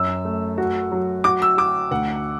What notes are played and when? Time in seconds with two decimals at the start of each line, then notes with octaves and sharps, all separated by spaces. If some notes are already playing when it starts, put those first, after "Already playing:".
Already playing: F#2 E6
0.25 A3
0.58 F#4
0.91 F#3
1.24 F#4 D6
1.42 E6
1.58 F#4 D6
1.91 D2 F#5